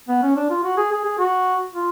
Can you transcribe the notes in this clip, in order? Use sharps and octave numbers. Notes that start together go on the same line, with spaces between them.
B3
C#4
D4
F4
F#4
G#4
G#4
G#4
F#4
F4